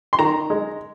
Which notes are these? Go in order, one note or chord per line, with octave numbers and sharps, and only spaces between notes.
C6
D#3 A#5
G#3